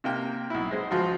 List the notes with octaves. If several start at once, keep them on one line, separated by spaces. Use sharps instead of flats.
C3 A#3 G5
B1 E4
G#3 C5
C#2 F3 F4 F#4